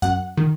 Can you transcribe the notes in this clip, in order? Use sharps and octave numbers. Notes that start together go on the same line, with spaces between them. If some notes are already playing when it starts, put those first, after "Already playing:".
F#2 F#5
D#3